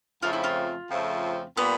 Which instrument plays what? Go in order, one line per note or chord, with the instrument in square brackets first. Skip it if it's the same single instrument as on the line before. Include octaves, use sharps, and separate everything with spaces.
[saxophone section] F2 C#3 F3 A3 C4 [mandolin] F4
[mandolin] E4
F4
[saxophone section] F2 C#3 F3 A3 C4
[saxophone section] A#2 G3 A#3 [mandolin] B3